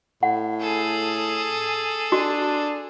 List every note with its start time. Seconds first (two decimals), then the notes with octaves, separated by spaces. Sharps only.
0.23 A2 F#5
0.60 G#4 A4
2.12 D4 F#4